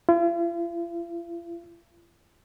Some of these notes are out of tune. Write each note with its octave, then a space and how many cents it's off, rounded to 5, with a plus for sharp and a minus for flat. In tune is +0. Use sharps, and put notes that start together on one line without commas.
F4 -45